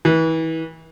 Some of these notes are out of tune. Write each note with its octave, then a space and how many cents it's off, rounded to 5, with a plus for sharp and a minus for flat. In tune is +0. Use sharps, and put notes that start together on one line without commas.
E3 -30